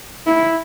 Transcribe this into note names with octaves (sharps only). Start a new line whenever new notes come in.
E4